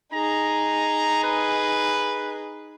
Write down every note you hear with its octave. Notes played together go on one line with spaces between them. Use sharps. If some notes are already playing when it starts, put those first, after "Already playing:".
D#4 G#4 A#5
B4